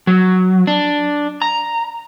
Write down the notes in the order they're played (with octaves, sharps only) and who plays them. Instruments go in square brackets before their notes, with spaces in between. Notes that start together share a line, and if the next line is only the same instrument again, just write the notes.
[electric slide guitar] F#3
D4
A#5